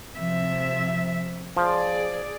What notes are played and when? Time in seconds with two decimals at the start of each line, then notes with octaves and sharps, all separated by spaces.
0.17 C3 F3 E5
1.57 F3 G#4 D5